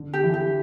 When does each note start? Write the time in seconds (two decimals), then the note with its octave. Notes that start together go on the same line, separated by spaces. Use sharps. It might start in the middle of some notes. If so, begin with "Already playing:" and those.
Already playing: D3
0.13 G4
0.23 E3
0.34 G4